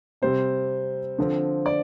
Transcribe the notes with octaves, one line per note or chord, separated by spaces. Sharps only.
C3 G3 C4 C5
D3 F3 C4
D5